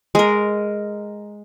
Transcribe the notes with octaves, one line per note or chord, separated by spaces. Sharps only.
G#3 A#4